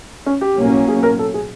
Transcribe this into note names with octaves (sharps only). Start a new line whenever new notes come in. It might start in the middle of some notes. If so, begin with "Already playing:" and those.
C#4
G4
B1 A2 F#3 A#3 C#4
G#4
A#4
A4
G#4